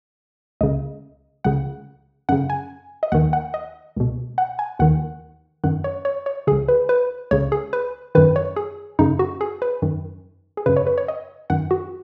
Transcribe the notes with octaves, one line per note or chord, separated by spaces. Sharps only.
C#2 C#3 D#5
C#2 C#3 F#5
F#2 C#3 F#5
G#5
D#5
D#2 D#3 F#5
F#5
D#5
C#2 B2
F#5
G#5
D#2 D#3 F#5
F#2 D#3 F#5
C#5
C#5
C#5
C#2 C#3 G#4
B4
B4
C#2 C#3 C#5
G#4
B4
F#2 D#3 B4
C#5
G#4
F#2 C#3 D#4
F#4
G#4
B4
F#2 D#3
G#4
F#2 C#3 B4
C#5
B4
C#5
D#5
F#2 D#3 F#5
F#4